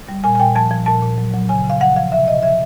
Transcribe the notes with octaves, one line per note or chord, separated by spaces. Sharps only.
G3
A#2 G#5
G#5
A#2 G5
F3 A5
F3
A#2 A5
A#2
F#3
F#3
C#3 G#5
C#3
F5
F3 F#5
F3 F5
C3 E5
C3 D#5
F3 E5